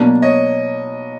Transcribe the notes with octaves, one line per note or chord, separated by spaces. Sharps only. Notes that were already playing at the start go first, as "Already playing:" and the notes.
Already playing: B2 F#3 A#3 D4
C#5 D#5